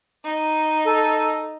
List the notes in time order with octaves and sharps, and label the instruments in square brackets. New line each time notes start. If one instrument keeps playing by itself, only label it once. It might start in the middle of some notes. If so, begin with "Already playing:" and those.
[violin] D#4
[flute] A4